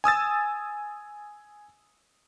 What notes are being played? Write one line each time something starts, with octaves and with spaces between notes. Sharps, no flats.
G#5 D#6 E6 A6